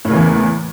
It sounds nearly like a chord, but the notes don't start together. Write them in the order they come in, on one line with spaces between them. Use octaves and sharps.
A2 A#3 C#3 E3 E2